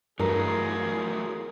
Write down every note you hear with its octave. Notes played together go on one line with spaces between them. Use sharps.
G2 E3 F#3 A3 F4 G#4 A#4